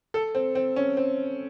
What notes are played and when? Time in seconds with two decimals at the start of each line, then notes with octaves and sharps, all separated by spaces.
0.14 A4
0.35 C4
0.55 C4
0.76 C#4
0.97 C4